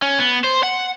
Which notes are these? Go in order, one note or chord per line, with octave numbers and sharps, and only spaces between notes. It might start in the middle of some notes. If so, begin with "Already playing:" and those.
C#4
B3
C5
F#5